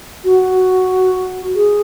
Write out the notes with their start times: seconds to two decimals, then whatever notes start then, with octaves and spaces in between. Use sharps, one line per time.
0.24 F#4
1.55 G#4